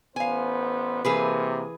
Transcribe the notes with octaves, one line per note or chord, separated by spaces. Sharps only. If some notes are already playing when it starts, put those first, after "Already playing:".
A1 B3 C5 F5 G#5
C3 E3 A#3 G#4 B4